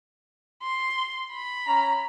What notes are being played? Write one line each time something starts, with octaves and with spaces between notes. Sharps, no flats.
C6
B5
C#4 A#5